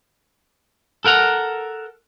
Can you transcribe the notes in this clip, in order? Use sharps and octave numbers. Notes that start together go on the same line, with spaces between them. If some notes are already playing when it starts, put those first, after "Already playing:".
A4 A#4 F#5 A#5